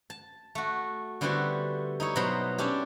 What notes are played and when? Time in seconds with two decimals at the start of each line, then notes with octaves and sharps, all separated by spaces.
0.10 A5
0.55 A3 F#4
1.21 D3 G3 B3 E4 F#4 C5
2.00 D#4 E4 C#5
2.16 B2 F#3 C5 B5
2.58 G3 C#4 D4 E4 G4